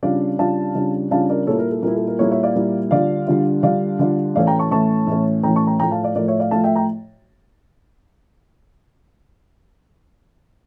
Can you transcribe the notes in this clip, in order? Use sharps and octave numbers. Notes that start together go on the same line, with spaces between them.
C#3 G3 D4 F4 D5 F5
C#3 G3 D4 F4 F5 A5
C#3 G3 D4 F4
C#3 G3 D4 F4 F5 A5
A#4 D5
A#2 G3 A#3 E4 A4 C#5
A#4
A4
A#2 G3 A#3 E4 A#4
A4
A#4
A#2 G3 A#3 E4 A4 C#5
C#5 E5
D5 F5
A#2 G3 A#3 E4
D3 G3 D4 F4 D5 F5
D3 G3 D4 F4
D3 G3 D4 F4 D5 F5
D3 G3 D4 F4
A2 E3 A3 C#4 D5 F5
G5 A#5
A5 C#6
A2 E3 A3 C#4 A5 C#6
A2 E3 A3 C#4
A2 E3 A3 C#4 G5 A#5
A5 C#6
G5 A#5
A2 F3 A3 G5 A#5
F5 A5
D5 F5
A2 F3 A3 A#4 D5
C#5 E5
D5 F5
A2 F3 A3 F5 A5
E5 G5
G5 A#5